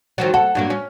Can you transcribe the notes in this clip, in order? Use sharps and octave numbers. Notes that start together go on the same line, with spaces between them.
D#3 F3 F#3
A4 F#5
G2 F#3 A#3
C#4